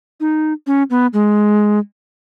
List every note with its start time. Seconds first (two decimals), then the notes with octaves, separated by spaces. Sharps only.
0.20 D#4
0.67 C#4
0.90 B3
1.13 G#3